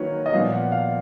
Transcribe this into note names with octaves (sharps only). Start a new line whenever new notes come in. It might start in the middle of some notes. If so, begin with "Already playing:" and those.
Already playing: D#3 F#3 A#3 B4 C#5
D#5
A#2 F3 B3 F5
F#5
F5